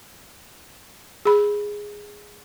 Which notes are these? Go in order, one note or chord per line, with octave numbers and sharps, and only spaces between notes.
G#4 B5